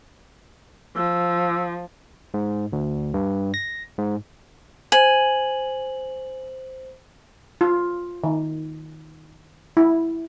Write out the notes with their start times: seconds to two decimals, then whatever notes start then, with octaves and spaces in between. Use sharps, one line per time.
0.96 F3 E6
2.34 G#2
2.73 D2
3.14 G2
3.54 A#6
3.98 G#2
4.92 C5 G#5 F#7
7.61 F4
8.24 D#3
9.77 E4